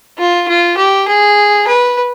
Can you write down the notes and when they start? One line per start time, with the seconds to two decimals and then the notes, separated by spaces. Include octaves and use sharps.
0.18 F4
0.48 F4
0.77 G4
1.08 G#4
1.67 B4